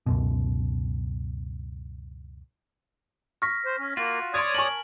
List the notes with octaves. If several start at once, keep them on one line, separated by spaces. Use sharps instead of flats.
C#2 F#2 B2
C#6 F6 A#6 B6
C5
C#4
A#3 F4 F#4 A6
C#5 D5 C6 D#6 G#6
A#4 G#5 A5 C#6 F#7